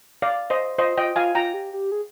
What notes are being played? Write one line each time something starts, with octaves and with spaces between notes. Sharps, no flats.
D5 F5
C5 D#5
F4 C5 D#5
F4 D#5 G5
F4 F5 G#5
F4 G5 A#5
G4
G4
G#4